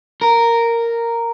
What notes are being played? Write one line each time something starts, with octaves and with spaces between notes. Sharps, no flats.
A#4